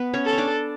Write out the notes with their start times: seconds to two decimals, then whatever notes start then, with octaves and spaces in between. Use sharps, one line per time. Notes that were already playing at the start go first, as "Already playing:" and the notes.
Already playing: B3 B4
0.14 C#4 C#5
0.26 A4
0.33 C#5
0.38 D4 D5